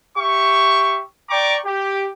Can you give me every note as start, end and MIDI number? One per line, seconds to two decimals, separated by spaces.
0.17 1.00 67
0.17 1.00 76
0.17 1.00 85
1.29 1.56 74
1.29 1.56 79
1.29 1.56 82
1.29 1.56 85
1.29 1.56 86
1.66 2.08 67